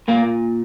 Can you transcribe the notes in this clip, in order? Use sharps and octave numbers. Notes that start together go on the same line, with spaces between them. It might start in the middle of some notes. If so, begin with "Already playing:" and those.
A#2 A#3